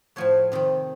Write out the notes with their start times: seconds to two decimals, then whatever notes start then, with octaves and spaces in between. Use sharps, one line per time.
0.16 A2 F3 A3 C#5
0.52 C3 D#3 G3